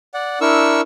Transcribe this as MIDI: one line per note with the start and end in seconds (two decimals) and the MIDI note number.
0.14 0.39 74
0.14 0.39 78
0.41 0.81 62
0.41 0.81 64
0.41 0.81 70
0.41 0.81 85
0.41 0.81 88